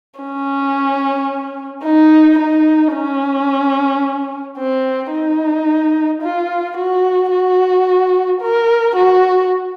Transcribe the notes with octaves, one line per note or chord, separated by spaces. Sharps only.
C#4
D#4
D#4
C#4
C4
D#4
F4
F#4
F#4
A#4
F#4